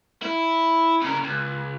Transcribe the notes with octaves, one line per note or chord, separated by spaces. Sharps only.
E4
C#3 A#4
C#2